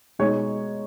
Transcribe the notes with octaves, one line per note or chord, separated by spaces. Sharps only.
B2 G#3 D#4 C#5